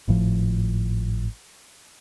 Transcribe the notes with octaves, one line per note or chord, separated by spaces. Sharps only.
G#1 A2 F3